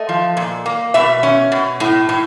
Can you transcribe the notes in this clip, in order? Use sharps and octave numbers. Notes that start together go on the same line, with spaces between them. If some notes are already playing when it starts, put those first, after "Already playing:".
Already playing: A3 D#5
F3
A#2
A#3
B2 E5
C#4
B2
A2
A2